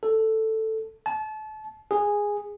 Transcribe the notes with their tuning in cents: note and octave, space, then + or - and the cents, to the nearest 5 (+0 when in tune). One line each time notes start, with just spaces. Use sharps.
A4 +5
A5 -30
G#4 -10